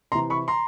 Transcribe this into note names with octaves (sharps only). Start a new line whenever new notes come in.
C3 E3 A#5 C6
B5 C#6
A#5 C6